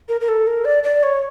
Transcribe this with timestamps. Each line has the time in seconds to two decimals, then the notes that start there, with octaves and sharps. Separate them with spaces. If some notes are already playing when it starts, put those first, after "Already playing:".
0.09 A#4
0.21 A#4
0.29 A4
0.47 A#4
0.65 D5
0.84 D5
1.03 C#5